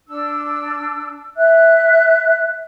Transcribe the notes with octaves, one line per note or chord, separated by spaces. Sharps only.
D4 E6
E5 F#6